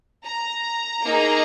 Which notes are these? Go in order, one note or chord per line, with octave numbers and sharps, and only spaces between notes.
A#5
A#3 D#4 G#4